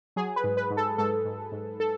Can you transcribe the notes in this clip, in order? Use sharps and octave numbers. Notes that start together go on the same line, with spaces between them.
F#3 G#4
B4
G#2
B4
G#2
A4
G#2 A4
G#2
G#2
A4